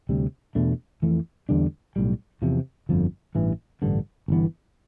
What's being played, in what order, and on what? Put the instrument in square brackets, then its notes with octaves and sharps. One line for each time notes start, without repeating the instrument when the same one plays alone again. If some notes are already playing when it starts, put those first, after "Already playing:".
[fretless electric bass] D2 C3 G3
E2 B2 A3 D4
F2 E3 A3
E2 D3 G3 D4
B1 A2 G3
E2 C3 F3
G1 F2 D3 F3
A1 G2 E3
A1 G2 D3
G1 E3 B3